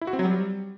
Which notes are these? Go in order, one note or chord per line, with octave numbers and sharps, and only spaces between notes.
E4
F#4
C4
F#3
G3